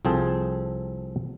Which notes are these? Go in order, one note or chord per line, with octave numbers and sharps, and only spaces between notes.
C2 F3 C4 G#4 A4